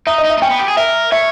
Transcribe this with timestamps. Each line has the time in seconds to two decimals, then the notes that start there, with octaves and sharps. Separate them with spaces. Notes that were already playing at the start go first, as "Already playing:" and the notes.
0.07 D#4 E5
0.18 D#5
0.24 D#4
0.30 E5
0.38 D#4
0.42 C#4 G5
0.50 B3
0.59 G4
0.68 G#4
0.77 A#4 E5
1.12 C#5 E5